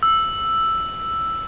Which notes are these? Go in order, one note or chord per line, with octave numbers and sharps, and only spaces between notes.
E6